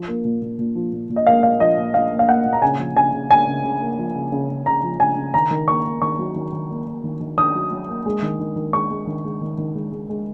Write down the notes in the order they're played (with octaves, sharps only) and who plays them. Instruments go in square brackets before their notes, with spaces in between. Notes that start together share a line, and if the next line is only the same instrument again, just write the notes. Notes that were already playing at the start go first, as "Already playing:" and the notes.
Already playing: [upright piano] F3
A#3
A#2
A#2
A#2
F3
A#2
A#2
D#5
A#3 F5
A#2 F5
F3 D#5
A#2
A#2 F5
A#3
F5
A#3 F#5
A#2
A#5
C#3 G#5
F3
C#3 G#5
C#3
A#3 G#5
C#3
C#3
A#3
F3
C#3
C#3
C#3
C#3 A#5
F3
C#3 G#5
C#3
D#3 A#5
D#3
A#3 C#6
A#3
D#3 C#6
F#3
D#3
D#3
A#3
A#3
D#3
D#3
D#3 D#6
F#3
F#3
A#3
G#3
D#3
D#3
D#3
G#3 C#6
G#3
D#3
G#3
D#3
D#3
G#3
G#3
G#3